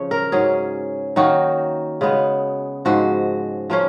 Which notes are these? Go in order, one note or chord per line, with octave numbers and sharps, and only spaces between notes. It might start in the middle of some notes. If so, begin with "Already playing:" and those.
Already playing: C#3 F3 C#5
A#4
G#2 F#3 C#4 G#4
D#3 F#3 A#3 D#4 F#4
C#3 G#3 B3
G#2 F3 G#3 F#4
F3 A#3 C#4